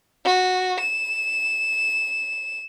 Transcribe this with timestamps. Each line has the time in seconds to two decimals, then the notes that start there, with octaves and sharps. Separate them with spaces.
0.24 F#4
0.79 E7